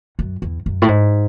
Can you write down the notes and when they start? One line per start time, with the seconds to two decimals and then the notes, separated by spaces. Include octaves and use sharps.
0.19 F#2
0.42 E2
0.66 F#2
0.82 A2
0.88 G#2